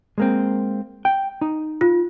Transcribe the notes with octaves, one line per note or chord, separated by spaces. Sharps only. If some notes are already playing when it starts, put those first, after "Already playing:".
G#3 A#3 C4
G5
D#4
F4